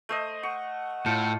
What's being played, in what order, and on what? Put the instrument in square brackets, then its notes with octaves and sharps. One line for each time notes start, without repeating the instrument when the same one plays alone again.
[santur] A3 C5 D#5
[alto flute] F#5 [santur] C#6
[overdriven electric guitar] A2 [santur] F4 [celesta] A5 G6 C#7